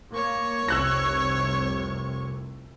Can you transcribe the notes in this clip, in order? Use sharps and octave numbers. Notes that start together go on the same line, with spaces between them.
A#3 C#5 C#6
F1 C2 C3 E6 F#6 A#6